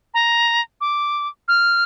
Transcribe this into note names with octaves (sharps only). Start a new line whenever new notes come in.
A#5
D6
F6